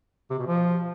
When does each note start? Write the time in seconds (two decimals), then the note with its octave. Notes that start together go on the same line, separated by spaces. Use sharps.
0.30 C3
0.38 B2
0.47 F3